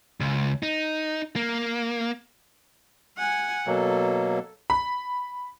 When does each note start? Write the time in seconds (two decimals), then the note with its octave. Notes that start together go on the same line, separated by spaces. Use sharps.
0.21 C#2
0.63 D#4
1.36 A#3
3.18 F#5 G#5
3.67 B2 F#3 A#3 A4
4.70 B5